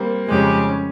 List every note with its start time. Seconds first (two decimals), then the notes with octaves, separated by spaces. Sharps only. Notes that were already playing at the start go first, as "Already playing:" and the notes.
Already playing: G3 A#3 C4
0.28 F2 C#3 G#3 C#4 G4
0.69 C#4